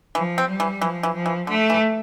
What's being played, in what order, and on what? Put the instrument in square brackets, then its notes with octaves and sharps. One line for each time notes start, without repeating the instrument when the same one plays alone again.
[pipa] E3 [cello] F3
[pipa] C4
[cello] G3
[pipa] E3
[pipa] E3 [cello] F3
[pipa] E3
[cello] F3
[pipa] E3
[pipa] D3 [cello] A3
[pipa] E3